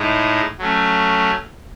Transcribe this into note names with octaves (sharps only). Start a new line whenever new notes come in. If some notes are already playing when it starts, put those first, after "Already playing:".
Already playing: A2 G#3 D#4
F#3 A3 C#4